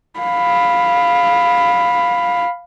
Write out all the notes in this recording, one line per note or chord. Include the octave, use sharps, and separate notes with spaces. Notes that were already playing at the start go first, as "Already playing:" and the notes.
F5 B5